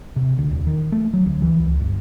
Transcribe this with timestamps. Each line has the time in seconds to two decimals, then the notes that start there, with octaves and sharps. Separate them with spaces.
0.16 C3
0.38 D2
0.51 D#1
0.67 D#3
0.92 A3
1.14 F#3
1.26 D2
1.42 E3
1.60 C#2
1.80 G1